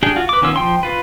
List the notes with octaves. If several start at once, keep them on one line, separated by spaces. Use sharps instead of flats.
D4 G4 G#4 G5
F4 F#4
B4 D6
D#3 B3 C#4 F4 E6
F3 G5 C6
F4 B4